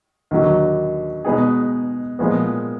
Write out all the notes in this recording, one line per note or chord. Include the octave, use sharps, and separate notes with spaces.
D#2 D3 F#3
B2 G#3 B3 D#4 G#4
A#2 F3 G#3 B3